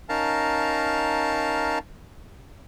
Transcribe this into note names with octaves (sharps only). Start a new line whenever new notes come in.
C#4 D#4 A#4 F5 A5 A#5